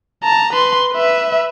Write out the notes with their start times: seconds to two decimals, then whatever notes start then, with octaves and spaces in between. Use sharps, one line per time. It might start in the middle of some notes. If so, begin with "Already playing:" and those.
0.24 A5 A#5
0.53 B4 C6
0.92 B4 E5